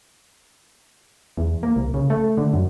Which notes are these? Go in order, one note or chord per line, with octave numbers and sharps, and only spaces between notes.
E2
A#3
C2
C#3
A3
D3
F#2